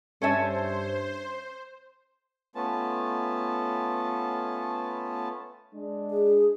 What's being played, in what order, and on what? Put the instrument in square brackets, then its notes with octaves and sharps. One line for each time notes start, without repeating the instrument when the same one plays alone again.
[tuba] G2 [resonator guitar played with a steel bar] C#4 C#5 E5 [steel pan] A4 G#5 A5 [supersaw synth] C5
[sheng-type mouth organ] A3 B3 C#4 F4 A5
[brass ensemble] G#3 D4
[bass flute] G#4